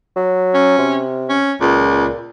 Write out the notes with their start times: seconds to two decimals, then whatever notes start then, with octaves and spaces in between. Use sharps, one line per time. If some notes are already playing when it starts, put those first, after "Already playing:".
0.16 F#3
0.54 C#4
0.78 C3
1.29 C#4
1.61 C#2 A#2